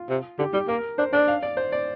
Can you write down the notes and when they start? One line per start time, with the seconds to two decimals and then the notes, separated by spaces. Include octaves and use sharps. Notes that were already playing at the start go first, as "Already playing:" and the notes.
Already playing: F4
0.09 C3
0.39 D3 G4
0.53 G3 G4
0.68 A#3 A#4
0.98 D4 C5
1.13 D4 D5
1.27 F5
1.43 D5
1.57 C5
1.72 D5